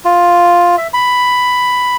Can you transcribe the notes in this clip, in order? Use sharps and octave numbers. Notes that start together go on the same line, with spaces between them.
F4
E5
B5